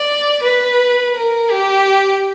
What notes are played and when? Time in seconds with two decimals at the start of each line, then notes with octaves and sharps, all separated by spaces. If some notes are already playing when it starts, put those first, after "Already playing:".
Already playing: D5
0.44 B4
1.16 A#4
1.51 G4